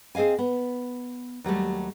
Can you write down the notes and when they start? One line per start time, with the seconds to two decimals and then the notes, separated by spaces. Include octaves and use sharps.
0.15 C4 G#4 D#5 F5 G#5
0.38 B3
1.44 D#2 F#3 G3 A3